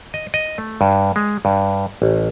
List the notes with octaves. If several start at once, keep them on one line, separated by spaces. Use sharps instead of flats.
D#5
D#5
A3
G2
G#3
G2
A1